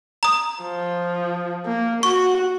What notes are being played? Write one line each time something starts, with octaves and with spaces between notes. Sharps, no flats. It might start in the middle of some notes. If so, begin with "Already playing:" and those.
A#5 D#6
F3
A#3
F#4 C#6